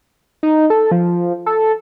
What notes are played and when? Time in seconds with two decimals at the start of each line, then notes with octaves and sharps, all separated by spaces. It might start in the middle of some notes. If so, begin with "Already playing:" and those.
0.43 D#4
0.70 A4
0.91 F3
1.46 A4